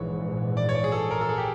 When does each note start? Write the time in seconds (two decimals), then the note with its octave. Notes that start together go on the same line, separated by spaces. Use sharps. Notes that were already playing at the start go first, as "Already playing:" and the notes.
Already playing: A#1 G#2 E3 C#5
0.57 D5
0.69 C#5
0.75 D5
0.84 G#4
0.92 A4
1.11 A#4
1.21 A4
1.29 G#4
1.38 G4